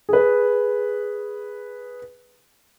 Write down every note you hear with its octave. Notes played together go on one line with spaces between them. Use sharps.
G#4 B4